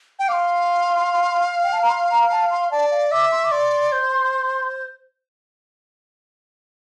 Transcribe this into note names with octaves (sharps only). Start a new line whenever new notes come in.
G5
F5 C6 D6
G5
A5
A#5
C6
A#5
A5
C6
D5 A5
F5
E5 D6
C6
D6
D5 C6
C5